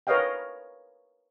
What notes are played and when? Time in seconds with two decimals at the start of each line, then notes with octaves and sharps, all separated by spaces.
0.07 A#4 B4 C#5 D#5 F5 G5